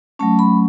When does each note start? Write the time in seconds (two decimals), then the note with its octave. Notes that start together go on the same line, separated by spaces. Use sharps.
0.19 F#3 A3 C#4 A5
0.39 B5